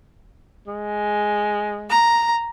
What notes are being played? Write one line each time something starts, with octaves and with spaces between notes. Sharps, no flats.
G#3
A#5